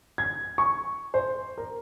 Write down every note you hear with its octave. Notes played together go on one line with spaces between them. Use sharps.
G#6
C#6
C5
A#4